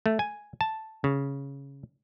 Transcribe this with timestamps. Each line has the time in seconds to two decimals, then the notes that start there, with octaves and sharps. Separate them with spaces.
0.06 A3
0.19 G#5
0.61 A5
1.04 C#3